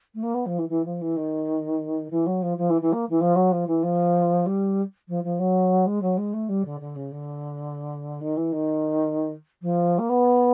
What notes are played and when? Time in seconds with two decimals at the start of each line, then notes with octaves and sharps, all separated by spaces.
0.14 A3
0.22 A#3
0.34 B3
0.46 F3
0.58 E3
0.69 E3
0.84 F3
1.01 E3
1.16 D#3
2.10 E3
2.26 F#3
2.42 F3
2.57 F3
2.69 E3
2.81 E3
2.92 A#3
3.09 E3
3.20 F3
3.35 F#3
3.51 F3
3.67 E3
3.83 F3
4.46 G3
5.08 F3
5.23 F3
5.39 F#3
5.86 G#3
6.01 F#3
6.17 G#3
6.33 A3
6.48 G3
6.65 D3
6.80 D3
6.95 C#3
7.11 D3
8.21 D#3
8.36 E3
8.52 D#3
9.61 F3
9.98 A#3
10.09 B3